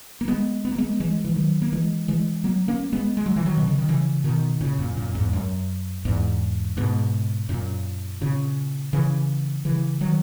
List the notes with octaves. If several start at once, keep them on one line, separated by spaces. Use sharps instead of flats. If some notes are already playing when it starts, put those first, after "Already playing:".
A#3
G#3 B3
B3
A#3
G#3 B3
E3 G#3
E3
D#3 F#3
A#3
E3 G#3
E3 G#3
F#3 A#3
A#3 C#4
G#3 B3
G#3
F#3
E3
D#3 F#3
B2
C#3
D#3
C#3 E3
B2 D#3
A#2 C#3
F#2 A#2
F#2 A#2
E2 G#2
F#2
E2 G#2
G#2 B2
F#2 A#2
A#2 C#3
C#3 E3
C#3 E3
D#3 F#3